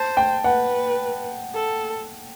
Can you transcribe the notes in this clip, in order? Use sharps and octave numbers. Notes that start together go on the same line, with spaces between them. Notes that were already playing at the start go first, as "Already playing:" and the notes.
Already playing: C5 A5
G5
B4 F#5
A4